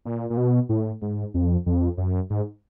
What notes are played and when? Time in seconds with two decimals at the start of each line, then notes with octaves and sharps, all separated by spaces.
0.05 A#2
0.30 A#2
0.37 B2
0.69 A2
1.02 G#2
1.34 F2
1.66 F2
1.97 F#2
2.30 G#2